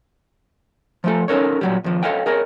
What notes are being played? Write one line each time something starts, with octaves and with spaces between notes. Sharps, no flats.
F3 A3 A4
C#4 D#4 A4 A#4 C#5
A#2 F#3 G3
D#2 F3
A4 B4 C#5 D#5 F5 G5
G#4 A#4 C#5 D#5